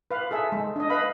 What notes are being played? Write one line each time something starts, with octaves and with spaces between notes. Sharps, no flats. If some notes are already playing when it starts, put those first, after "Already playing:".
B4 F5
G#4 A4 E5
G#3
D4 D#5
B4 D#5 F5 B5